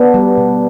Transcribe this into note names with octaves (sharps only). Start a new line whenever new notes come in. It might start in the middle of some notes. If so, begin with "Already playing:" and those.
Already playing: B3 D4
G3
B2